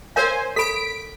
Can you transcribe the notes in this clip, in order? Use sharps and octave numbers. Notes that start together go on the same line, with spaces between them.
A#4 C5 C#5 F5 G#5
A4 B5 B6 D7